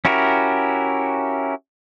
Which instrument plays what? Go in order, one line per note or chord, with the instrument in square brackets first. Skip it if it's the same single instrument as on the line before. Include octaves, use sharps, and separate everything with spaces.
[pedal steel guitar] C#4 E4 F#4 G4 A#4